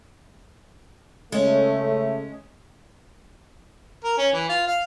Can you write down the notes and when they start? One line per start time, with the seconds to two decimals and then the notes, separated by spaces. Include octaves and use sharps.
1.32 C#3 G#3 A3 C#4
4.04 A#4
4.18 C#4
4.33 E3
4.49 F4
4.67 F5